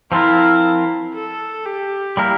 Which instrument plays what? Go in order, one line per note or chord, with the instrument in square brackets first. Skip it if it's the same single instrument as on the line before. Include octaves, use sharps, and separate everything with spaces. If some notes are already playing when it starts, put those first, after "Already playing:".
[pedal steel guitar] F3 C4 F4 A#4 [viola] E4
[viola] A4
G4
[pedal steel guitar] G3 A#3 E4 A#4